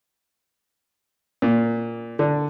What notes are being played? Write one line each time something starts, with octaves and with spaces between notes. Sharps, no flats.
A#2
D3